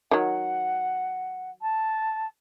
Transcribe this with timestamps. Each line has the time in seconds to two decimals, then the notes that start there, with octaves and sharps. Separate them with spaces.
0.11 D#3 F#3 F#5
1.62 A5